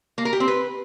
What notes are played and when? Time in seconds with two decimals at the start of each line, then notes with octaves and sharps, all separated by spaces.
0.18 A#3
0.25 A#4
0.33 G4
0.40 C4
0.48 B4